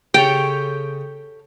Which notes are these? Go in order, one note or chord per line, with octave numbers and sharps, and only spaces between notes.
C#3 G4 A4 C#5 G5